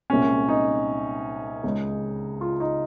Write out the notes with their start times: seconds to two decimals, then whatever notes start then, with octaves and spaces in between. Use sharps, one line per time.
0.10 C2 A#2 G#3 C#4
0.48 D#4
1.64 C#2 C#3 G#3
2.41 F4
2.60 D#4